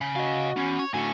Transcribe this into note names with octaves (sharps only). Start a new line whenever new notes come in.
C#3
F#4 D#5 F5
E2 C#4
C#5
A2 D3 F#4 C#5 G#5